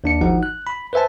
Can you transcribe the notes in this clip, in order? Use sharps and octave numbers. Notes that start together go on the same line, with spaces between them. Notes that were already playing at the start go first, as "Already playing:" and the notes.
D#2 D4 C#7
G#1 F3 D#4 F#5
F#6
B5
B4 C5 E5 G#5 A5